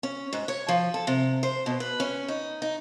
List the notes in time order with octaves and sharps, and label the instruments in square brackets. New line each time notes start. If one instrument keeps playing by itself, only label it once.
[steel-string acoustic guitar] C#4
G#2
C#5
F3
A4
C3
C5
B2
B4
C#4
D#4
D#4